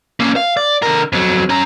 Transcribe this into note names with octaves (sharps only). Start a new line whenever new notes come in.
A#3 C#4
F5
D5
D3 A#4
F2 F#3
C#4 A#5